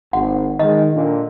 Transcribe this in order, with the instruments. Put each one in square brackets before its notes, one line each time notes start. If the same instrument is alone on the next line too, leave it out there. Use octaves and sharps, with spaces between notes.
[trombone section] G#1 [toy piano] F#5
[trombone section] D#3 G#3 [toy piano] D#5
[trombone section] A#2 D3